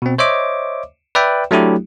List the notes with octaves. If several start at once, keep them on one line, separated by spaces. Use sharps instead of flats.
B2 C4
C5 C#5 D#5 E5 D6
B4 D5 E5 G5
F#3 A3 D4 E4 G4